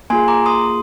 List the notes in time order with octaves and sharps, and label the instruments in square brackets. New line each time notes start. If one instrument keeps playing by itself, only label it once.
[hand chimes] A#3 F4 G#4 G#5 C6
A#5 D6
C6 D#6